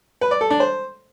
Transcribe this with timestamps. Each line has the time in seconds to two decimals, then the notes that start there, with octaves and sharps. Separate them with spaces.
0.21 B4
0.31 D5
0.41 A4
0.50 D4
0.60 C5